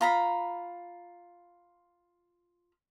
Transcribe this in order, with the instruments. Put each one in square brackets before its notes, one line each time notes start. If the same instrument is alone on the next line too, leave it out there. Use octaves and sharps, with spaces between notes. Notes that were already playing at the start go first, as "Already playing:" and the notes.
[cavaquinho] F4 A#5 B5